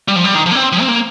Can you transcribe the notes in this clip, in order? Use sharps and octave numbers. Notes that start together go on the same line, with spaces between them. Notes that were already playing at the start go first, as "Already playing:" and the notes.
G3
F3
G3
D#3
F3
A#3
C4
F3
C4
A#3